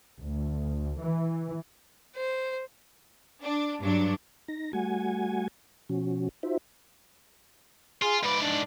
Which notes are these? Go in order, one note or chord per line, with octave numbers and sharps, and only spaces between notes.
D2
E3
C5
D4
G2 F#3 D4
D#4 A#6
G3 A3 F#4 F#5 G#5 G#6
B2 F3 C#4 F#4
D#4 F4 F#4 C5 E5
F4 G#4
G#2 B4 D5
D4